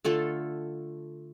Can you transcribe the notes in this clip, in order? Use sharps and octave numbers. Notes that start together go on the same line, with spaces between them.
D3 A3 F4 A4